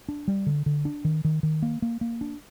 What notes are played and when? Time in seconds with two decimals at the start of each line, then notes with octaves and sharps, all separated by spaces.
0.09 D4
0.28 G3
0.46 D3
0.66 D3
0.85 D4
1.05 D#3
1.25 D#3
1.43 D#3
1.62 A#3
1.82 A#3
2.01 A#3
2.21 D4